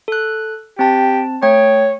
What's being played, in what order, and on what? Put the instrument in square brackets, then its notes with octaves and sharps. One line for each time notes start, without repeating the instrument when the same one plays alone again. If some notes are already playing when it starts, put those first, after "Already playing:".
[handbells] A4 F#6
[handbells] C4 A5 [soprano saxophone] G4
[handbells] A3 G5 G#6 [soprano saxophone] C#5